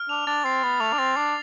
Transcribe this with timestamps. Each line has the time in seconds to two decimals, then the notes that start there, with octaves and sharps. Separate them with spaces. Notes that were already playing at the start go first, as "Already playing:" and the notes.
Already playing: F6
0.09 D4 F7
0.27 D4 A6
0.45 C4 C7
0.63 B3 A6
0.80 A3 F7
0.93 D4
0.98 C4 A6
1.17 D4 C7